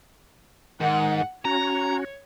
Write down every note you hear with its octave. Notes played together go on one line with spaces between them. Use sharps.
G#2 D#3 F#5
C#4 F#4 C#5 A#5